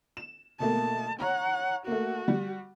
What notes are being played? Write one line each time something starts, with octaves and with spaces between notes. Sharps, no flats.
E7
B2 A3 A#3 A5
C#5 F#5 A#5
A3 A#3 F#4
G3